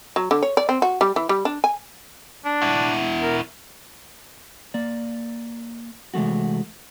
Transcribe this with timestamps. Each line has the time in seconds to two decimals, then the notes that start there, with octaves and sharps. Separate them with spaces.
0.16 F#3
0.31 D3
0.43 C#5
0.57 D5
0.69 C4
0.82 F#4
1.01 G3
1.16 E3
1.29 G3
1.45 D4
1.64 G#5
2.45 D4
2.62 E4 F#4
3.22 A#4
4.74 A#3 D5
6.14 C3 E3 G#3 A3 F#4